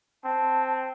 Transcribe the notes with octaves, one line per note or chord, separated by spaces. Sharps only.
C4 A5